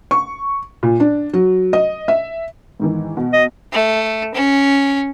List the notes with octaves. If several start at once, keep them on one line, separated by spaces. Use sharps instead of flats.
C#6
A#2
D4
F#3
D#5
E5
G#2 D#3 E3
B2
D#5
A3
C#4